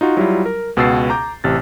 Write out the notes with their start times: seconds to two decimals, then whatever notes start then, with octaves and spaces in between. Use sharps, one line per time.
0.01 D#4 F4 F#4
0.17 F#3 G3 E4 F4
0.46 A#4
0.77 C#2 B2 F#5 E6 A6 C7
1.10 A#5 D6 G6
1.44 A1 C3 A6